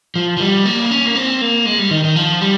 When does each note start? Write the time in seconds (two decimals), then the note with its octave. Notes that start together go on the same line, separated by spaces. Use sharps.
0.16 F3
0.37 F3
0.40 G3
0.65 A#3
0.91 C#4
1.06 A#3
1.16 C4
1.41 A#3
1.66 G#3
1.79 G3
1.91 D#3
2.04 D#3
2.16 F3
2.41 G3